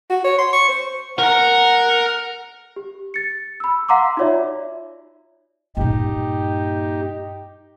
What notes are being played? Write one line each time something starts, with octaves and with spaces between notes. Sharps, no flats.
F#4
C#5
C6
C#6
C5
A#4 F#5 A#5
G4
A6 C#7
B5 E6
F5 F#5 A#5 C6 D6 E6
D#4 F4 F#4 C#5 D5 E5
G2 A#2 D#4 G4